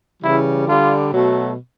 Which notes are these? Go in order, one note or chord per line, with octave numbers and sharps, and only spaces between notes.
C#3 E3 G3 E4
D3 G3 F4
B2 F#3 A3